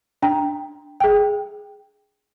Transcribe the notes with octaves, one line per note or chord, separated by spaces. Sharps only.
D4 G5 A#5
G#4 G5